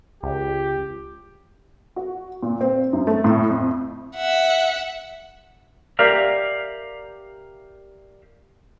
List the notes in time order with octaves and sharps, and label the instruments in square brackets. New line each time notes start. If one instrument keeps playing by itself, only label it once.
[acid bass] C#2 [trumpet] G4
[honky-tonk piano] F#4
A#2
C4
F#2
A3
A2
F2
[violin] E5 F#5
[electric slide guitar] G4 A#4 D5 E5 F5